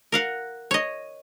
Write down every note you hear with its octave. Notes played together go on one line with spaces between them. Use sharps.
A#4 F5 F#5
C#5 D#5